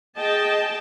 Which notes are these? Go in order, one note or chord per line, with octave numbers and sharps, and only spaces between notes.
G#4 D#5 G5 A5